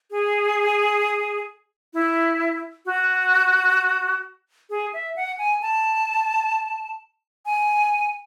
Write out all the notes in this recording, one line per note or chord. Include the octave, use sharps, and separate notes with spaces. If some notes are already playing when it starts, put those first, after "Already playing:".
G#4
E4
F#4
G#4
E5
F#5
G#5
A5
G#5